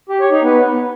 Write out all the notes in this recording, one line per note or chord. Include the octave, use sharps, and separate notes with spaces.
G4
C#5
D#4
B3